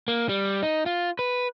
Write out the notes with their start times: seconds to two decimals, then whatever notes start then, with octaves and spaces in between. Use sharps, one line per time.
0.08 A#3
0.29 G3
0.63 D#4
0.86 F4
1.19 B4